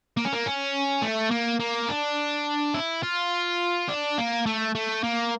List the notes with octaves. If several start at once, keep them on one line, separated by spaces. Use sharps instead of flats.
A#3
C#4
A#3
C#4
A3
A#3
A#3
D4
E4
F4
D4
A#3
A3
A3
A#3